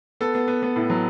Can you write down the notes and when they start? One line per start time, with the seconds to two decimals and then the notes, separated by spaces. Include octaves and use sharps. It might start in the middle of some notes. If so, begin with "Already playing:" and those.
0.21 B3 A4
0.35 B3
0.48 B3
0.63 B3
0.76 A2
0.90 F#3